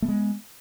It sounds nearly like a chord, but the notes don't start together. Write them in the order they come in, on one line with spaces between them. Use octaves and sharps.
A3 B3 G#3